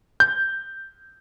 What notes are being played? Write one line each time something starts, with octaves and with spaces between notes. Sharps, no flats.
G6